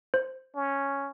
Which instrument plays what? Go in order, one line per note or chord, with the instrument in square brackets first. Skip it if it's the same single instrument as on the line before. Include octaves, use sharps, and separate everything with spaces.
[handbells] C5
[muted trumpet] C#4